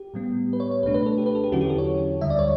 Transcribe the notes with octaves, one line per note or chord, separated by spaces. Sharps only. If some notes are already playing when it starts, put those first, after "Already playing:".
Already playing: G4
A2 G3 B3
B4
C#5
C#5
C#2 B2 A3 D4 B4
B4
A4
G4
B4
A4
G4
E2 D3 F#3 C#4 E4 F#4
G4
A4
C#5
D2 D3 G3 E5
D5
C#5